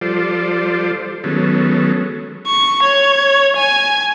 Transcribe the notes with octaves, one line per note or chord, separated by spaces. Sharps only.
F3 G3 F4 A4 C5 D5
D#3 F#3 G#3 B3 C#4 A4
C#6
C#5
G#5